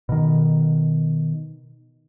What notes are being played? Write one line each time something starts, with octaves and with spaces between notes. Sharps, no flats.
B2 D#3